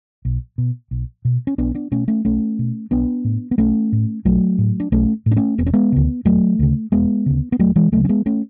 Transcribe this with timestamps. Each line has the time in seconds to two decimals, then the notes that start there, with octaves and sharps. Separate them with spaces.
0.25 B1
0.58 B2
0.91 B1
1.25 B2
1.47 C#4
1.58 B1 B3 D4
1.74 B3 D4
1.92 B2 A3 C#4
2.08 A3 C#4
2.25 B1 A3 C#4
2.59 B2
2.91 B1 B3 D4
3.25 A2
3.51 B3
3.58 B1 A3 C#4
3.92 A2
4.25 B1 F#3 A3
4.58 A2
4.80 D4
4.92 B1 A3 C#4
5.26 A2
5.31 D4
5.37 A3 C#4
5.58 E1 B3
5.66 C#4
5.73 G#3 B3
5.92 D2 C#3
6.25 E1 F#3 A3
6.59 D2 C#3
6.92 E1 G#3 B3
7.26 D2 C#3
7.52 B3
7.59 E1 F#3 A3
7.76 E3 G#3
7.92 D2 C#3 F#3 A3
8.05 C#4
8.09 G#3 B3
8.26 A3 C#4